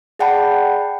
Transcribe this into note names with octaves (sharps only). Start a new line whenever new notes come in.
G#4 D5 F#5 G5 A5 B5